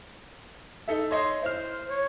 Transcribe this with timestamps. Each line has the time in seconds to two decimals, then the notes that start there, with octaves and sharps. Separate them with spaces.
0.88 D#4 A4 E5
1.11 C#5 D#5 C6
1.42 E4 C5 F6
1.89 C#5